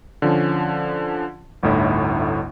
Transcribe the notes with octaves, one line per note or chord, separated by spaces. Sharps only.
D3 F3 C#4
G1 D2 A2 D#4 E4 C#5